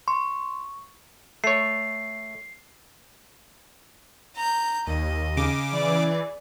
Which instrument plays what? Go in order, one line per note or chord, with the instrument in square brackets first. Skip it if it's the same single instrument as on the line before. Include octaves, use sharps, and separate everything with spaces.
[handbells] C6 [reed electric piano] C#6
[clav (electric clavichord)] A3 C#5 [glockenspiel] C7
[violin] A#5 G6
[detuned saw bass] D#2 [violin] D#5
[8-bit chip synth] C#3 D6
[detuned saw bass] E3 [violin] G#4 D5